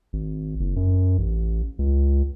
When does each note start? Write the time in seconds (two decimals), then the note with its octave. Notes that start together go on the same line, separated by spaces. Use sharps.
0.13 G#1
0.60 F#1
0.76 F#2
1.18 A1
1.79 C#2